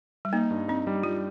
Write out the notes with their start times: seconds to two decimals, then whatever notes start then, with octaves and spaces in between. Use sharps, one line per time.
0.25 G3
0.33 A#3 D#4
0.51 G2
0.68 C4 D#4
0.87 G3
1.03 G3 F4